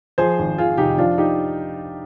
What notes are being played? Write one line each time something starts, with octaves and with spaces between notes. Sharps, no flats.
F3 G#4 C5
G#1
D#3 F4 G#4
F1 D#4 G4
F3 D4 F4
D#4 G4